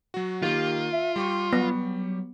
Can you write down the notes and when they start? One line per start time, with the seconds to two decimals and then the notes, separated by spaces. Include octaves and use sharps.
0.14 F#3 F#4
0.42 D#3 A#3 F4 G4
0.92 E5
1.16 G3 G4 C6 C#6
1.53 F#3 B3